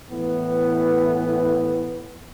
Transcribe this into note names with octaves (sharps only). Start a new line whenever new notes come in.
A2 E3 B3